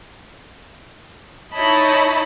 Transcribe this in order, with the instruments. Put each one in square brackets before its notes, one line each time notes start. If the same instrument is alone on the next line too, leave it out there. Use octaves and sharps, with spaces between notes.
[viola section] D#4 E4 C#5 D#5 A5 B5